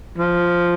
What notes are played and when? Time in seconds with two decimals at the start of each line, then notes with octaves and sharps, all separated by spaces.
0.18 F3